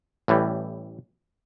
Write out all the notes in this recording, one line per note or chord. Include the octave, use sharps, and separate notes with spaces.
A1 A2 E3 G3